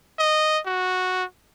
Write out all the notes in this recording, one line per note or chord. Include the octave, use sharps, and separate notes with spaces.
D#5
F#4